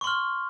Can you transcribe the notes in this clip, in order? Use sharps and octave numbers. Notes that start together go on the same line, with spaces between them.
C6 C#6 F6